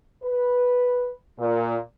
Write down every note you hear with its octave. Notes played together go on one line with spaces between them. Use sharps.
B4
A#2